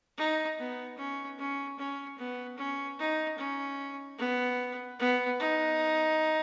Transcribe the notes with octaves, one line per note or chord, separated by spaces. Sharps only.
D#4
B3
C#4
C#4
C#4
B3
C#4
D#4
C#4
B3
B3
D#4